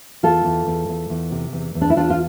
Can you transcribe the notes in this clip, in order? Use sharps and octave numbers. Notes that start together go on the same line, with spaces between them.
E2 F4 A4
E2
E2
E2
E2
C3
E2
E2
D4
E4
E2 D4 F4
F4